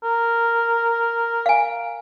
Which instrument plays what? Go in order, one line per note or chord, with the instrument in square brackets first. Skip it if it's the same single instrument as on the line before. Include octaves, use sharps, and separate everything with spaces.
[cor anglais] A#4
[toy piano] F5 G#5